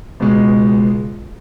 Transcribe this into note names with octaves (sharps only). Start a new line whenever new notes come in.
C#2 B2 G#3